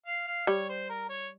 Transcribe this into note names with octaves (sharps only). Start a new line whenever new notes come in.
F5
F5
G3 C#5
C5
A#4
C#5